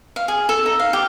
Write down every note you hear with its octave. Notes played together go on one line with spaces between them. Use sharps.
F5
G#4
A4
D#4
F5
G4